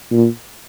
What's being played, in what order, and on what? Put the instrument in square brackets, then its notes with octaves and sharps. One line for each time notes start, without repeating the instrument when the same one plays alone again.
[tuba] A#2